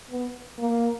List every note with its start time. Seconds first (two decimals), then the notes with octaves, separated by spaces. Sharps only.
0.11 B3
0.58 A#3